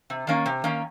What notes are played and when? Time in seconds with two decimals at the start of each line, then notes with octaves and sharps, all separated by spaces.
0.10 C3
0.27 D#3 A#3 C#4
0.46 C3
0.64 D#3 A#3 C#4